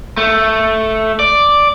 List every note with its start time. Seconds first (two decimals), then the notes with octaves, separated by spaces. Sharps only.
0.17 A3
1.20 D5